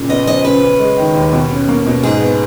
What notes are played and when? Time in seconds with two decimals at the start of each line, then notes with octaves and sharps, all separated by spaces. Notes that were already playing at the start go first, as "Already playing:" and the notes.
Already playing: A#2 C#3
0.09 B3 D#5
0.27 F3 D#5
0.45 C#3 B4
0.62 C#4
0.79 G#3
0.98 D#3
1.15 D#2
1.33 B2
1.51 C#4
1.69 A#3
1.86 B2
2.03 G#2 G#4
2.22 B3